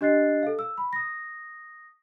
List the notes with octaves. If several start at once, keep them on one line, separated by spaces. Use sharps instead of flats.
D4 G4 D#5 F#6 A6 C7
A4 F5
E6
B5
D#6 A#6